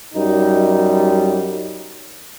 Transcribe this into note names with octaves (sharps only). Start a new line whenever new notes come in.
F#2 G3 D#4